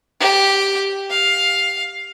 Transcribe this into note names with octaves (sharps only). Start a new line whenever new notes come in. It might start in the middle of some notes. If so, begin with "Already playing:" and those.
G4
F5